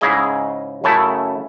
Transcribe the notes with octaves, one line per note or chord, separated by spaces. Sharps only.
G#2 C#3 E4 G#4 D#5 G#5
F#2 C#3 A3 E4 A5